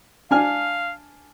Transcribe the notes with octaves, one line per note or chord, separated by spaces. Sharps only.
D4 F5 G#5 F6